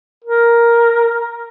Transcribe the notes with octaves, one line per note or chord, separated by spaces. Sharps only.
A#4